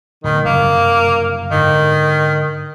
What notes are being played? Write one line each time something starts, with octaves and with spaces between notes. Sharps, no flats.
D1 B2 D#3
F#1 G2 C3 A#3
G#2 D3 D#3